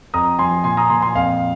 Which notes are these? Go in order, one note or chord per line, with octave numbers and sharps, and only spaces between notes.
F2 A#5 D#6
F3 G#5 C6
A#2 G#5 C6
A#5 D#6
A#2 G#5 C6
G#5 C6
F2 F5